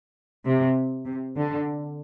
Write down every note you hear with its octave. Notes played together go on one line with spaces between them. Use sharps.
C3
C3
D3